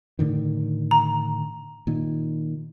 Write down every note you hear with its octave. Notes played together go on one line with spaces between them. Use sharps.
A2 D3 D#3
A#5
A#2 D#3